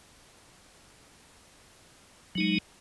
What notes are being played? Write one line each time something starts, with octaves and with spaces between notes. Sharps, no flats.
F#3 G#3 D#4